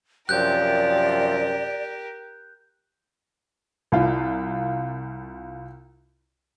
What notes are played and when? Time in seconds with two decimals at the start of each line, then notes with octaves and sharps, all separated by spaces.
0.29 F#2 C3 F3 G4 A#4 D5 F#6 G6
3.92 C2 F4